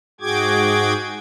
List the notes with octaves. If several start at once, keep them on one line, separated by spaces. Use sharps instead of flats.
G#2 F#4 G#4 G5 D6 G#6